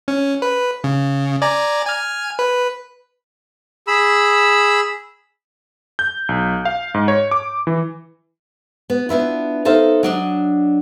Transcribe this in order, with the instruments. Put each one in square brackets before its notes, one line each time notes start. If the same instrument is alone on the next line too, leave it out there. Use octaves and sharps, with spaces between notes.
[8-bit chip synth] C#4
B4
C#3
D5 G#5 A#5
G#5 F6
B4
[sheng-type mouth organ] G#4 B5 E6
[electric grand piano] G6
B1
F5
G#2
C#5
D6
E3
[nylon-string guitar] B3
B3 D4 E4 F4
D#4 A4 C5 E5 F5
F#3 D4 D#5